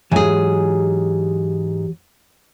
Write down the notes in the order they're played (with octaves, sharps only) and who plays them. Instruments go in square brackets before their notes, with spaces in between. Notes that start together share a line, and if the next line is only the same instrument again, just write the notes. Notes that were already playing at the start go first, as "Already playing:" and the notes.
[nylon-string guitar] G#2 G#4 [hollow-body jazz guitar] E3 F#3 G#5 [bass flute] G4